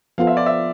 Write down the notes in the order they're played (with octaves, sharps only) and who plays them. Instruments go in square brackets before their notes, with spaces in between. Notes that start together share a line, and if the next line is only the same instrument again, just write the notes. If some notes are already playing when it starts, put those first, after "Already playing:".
[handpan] F3 B3 F4 A4 [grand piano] F5
[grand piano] E5
D5
E5